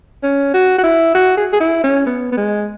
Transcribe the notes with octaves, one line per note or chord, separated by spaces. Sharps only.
C#4
F#4
F#4
E4
F#4
G#4
G#4
E4
C#4
B3
B3
G#3